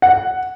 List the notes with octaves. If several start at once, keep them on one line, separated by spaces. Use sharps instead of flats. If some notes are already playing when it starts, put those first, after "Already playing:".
F#5